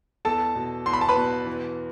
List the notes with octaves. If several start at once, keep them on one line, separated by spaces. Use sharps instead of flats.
E2 A4 A5
B2
E2 C6
B5
A5
B4 B5
B2
E3